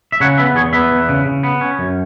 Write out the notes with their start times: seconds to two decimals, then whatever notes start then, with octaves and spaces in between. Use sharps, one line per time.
0.12 E5
0.20 C#3 C#5 F#5
0.38 B3 B4 E5
0.55 E2 G#4 C#5
0.73 B3 B4 E5
0.91 E2
1.09 C#3
1.26 C#3
1.43 B3
1.61 C#4
1.79 F#2